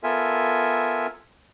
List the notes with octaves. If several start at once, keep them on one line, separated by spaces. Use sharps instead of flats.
B3 F4 A4 A#4 E5 G#5